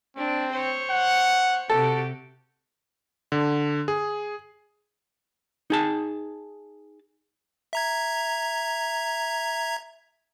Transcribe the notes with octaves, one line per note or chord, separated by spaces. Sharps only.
C4 D4
C5 C#5
F#5
C3 F#4 G4 A4
D3
G#4
D#4 G#4 A5
E5 A#5 G#6